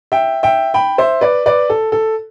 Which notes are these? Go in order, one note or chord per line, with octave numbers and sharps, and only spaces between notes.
E5 G5
E5 G5
G5 B5
C5 E5
B4 D5
B4 D5
A4
A4